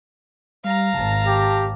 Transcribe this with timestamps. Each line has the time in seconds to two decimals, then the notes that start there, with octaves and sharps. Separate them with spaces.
0.64 G3 F5 A#5
0.94 G#1 A5
1.27 G4